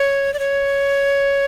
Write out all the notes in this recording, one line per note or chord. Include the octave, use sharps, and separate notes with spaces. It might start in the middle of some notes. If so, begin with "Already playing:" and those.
Already playing: C#5
D5
C#5